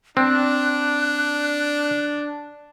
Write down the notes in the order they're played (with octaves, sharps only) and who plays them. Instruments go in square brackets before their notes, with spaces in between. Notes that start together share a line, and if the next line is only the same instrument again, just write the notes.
[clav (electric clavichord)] C4 [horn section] D4 [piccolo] F#6